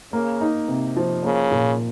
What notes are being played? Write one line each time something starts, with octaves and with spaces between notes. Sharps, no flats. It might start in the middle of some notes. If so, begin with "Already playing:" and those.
C#3 A#3
D#4
C3
F3
C#3 A#3
A#2